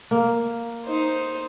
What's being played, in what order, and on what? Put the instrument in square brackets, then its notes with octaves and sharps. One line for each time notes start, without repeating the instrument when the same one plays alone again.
[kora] A#3
[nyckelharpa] D#4 C5